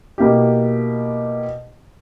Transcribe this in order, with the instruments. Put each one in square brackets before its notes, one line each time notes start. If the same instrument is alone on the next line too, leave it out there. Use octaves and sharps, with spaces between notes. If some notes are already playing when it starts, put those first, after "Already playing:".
[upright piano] B2 A#3 E4 G4